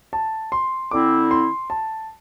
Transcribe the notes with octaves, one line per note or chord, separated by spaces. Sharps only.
A5
C6
D3 C4 E4 D6
C6
A5